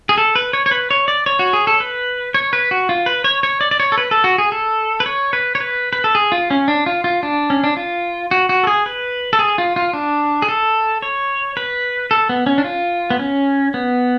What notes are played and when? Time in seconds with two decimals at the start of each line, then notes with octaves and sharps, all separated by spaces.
0.09 G#4
0.18 A4
0.36 B4
0.53 C#5
0.66 C#5
0.71 B4
0.91 C#5
1.08 D5
1.26 C#5
1.39 F#4
1.53 G#4
1.67 A4
1.80 B4
2.34 C#5
2.53 B4
2.71 F#4
2.89 F4
3.06 B4
3.24 C#5
3.43 C#5
3.61 D5
3.71 D5
3.80 C#5
3.92 A4
3.98 B4
4.11 A4
4.24 F#4
4.38 G#4
4.52 A4
5.00 B4
5.06 C#5
5.33 B4
5.55 C#5
5.60 B4
5.93 B4
6.04 A4
6.15 G#4
6.32 F4
6.51 C#4
6.68 D4
6.86 F4
7.04 F4
7.23 D4
7.50 C#4
7.64 D4
7.77 F4
8.31 F#4
8.49 F#4
8.63 A4
8.67 G#4
8.86 B4
9.33 A4
9.39 G#4
9.58 F4
9.76 F4
9.93 D4
10.42 G#4
10.49 A4
11.02 C#5
11.57 B4
12.11 A4
12.29 B3
12.46 C#4
12.58 D4
12.64 F4
13.10 B3
13.19 C#4
13.74 B3